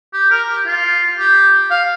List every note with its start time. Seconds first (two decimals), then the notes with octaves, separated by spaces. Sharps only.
0.13 G4
0.31 A#4
0.49 G4
0.66 F4
1.18 G4
1.70 F5